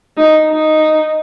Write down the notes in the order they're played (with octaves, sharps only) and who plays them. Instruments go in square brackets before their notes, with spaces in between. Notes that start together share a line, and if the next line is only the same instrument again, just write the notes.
[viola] D#4
D#4